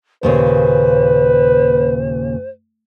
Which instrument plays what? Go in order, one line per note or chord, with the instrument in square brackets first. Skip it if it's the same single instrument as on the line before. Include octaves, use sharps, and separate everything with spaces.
[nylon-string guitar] D#2 A#2 C#3 [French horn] B4 [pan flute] C5